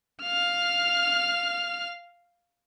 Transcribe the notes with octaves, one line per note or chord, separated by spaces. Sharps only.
F5 F6